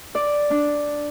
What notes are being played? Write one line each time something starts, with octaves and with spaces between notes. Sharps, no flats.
D5
D4